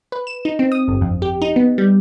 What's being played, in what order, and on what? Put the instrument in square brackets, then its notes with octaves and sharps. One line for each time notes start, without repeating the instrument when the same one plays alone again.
[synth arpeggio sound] B4
E7
D#4
C4
D#6
G1
F2
G4
D#4
B3
G3